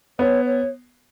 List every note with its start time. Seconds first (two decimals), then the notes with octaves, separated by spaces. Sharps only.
0.19 B3 C#5
0.45 C#5